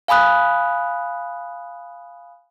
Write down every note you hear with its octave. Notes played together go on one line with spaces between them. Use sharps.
F5 G#5 B5 D#6 F#6